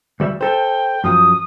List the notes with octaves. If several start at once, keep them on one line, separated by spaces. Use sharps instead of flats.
D2 G3 E5
A4 C5 G5
F#2 F3 D#6